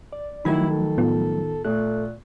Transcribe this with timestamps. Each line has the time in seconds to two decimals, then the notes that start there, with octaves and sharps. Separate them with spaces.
0.13 D5
0.45 D#3 F3 F#3 A3 E4 B5 G#6
0.70 A4
0.98 A2 B3 F4
1.65 A#2 A3 F#6